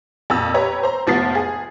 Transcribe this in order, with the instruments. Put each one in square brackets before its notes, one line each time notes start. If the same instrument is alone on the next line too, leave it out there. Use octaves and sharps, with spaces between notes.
[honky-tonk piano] F2 A#2 E6
G4 B4 C#5 A#5 B5
C5 A#5
F1 F3 B3 A6 C7
G#4